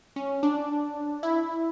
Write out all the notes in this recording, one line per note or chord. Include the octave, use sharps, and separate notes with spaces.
C#4
D4
E4